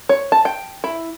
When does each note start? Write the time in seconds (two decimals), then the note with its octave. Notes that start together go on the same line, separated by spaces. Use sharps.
0.09 C#5
0.32 A5
0.45 G5
0.84 E4